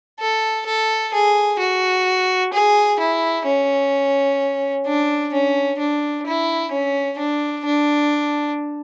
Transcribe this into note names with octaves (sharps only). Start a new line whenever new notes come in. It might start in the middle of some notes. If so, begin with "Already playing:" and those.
A4
A4
G#4
F#4
G#4
E4
C#4
D4
C#4
D4
E4
C#4
D4
D4